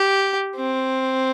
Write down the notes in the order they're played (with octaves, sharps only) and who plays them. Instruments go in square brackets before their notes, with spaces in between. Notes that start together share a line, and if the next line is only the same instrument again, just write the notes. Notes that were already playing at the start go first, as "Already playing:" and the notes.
Already playing: [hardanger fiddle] G4
C4